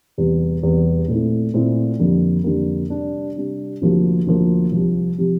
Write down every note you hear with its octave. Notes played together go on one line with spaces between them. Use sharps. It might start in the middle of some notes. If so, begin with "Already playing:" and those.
E2 C3 G3
E2 C3 G3
A#2 A3 C4 E4
A#2 A3 C4 E4
F2 D3 G3 A#3
F2 D3 G3 A#3
C3 G3 D4
C3 G3 D4
D2 C3 F3 A#3
D2 C3 F3 A#3
C2 C3 F3
C3 F3